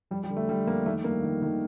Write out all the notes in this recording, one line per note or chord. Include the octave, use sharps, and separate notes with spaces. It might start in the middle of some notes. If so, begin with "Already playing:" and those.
F2 G3
G3
D3
A3
D3 G3
F2 A#3
D#3 A3
G2 A#3
D#3
D#3